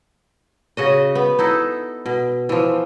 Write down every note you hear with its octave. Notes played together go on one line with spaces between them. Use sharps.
C#3 F#4 D#5
B3
D#4 E4 A4
B2
E3 F3